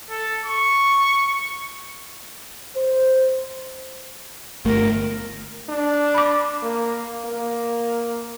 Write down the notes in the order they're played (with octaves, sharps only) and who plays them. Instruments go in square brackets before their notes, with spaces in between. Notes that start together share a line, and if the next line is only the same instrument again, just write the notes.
[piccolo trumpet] A4
C#6
[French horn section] C5
[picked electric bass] G1 A3 [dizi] A#4
[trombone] D4
[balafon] B5 D6
[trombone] A#3
A#3